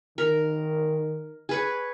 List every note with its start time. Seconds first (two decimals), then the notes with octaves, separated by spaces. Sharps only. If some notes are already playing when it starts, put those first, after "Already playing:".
0.18 D#3 A#4
1.49 G#4 B4 C#5